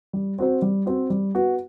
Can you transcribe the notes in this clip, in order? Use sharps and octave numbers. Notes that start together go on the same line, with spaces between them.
G3
C4 F#4 C5
G3
C4 F#4 C5
G3
B3 F#4